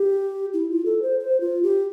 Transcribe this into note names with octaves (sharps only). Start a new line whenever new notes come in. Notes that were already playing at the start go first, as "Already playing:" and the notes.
Already playing: G4
E4
F4
A4
C5
C5
F4
G4